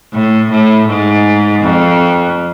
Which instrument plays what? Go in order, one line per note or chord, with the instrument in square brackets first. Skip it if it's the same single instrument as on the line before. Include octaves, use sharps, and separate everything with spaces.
[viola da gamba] A2
A2
G#2
F2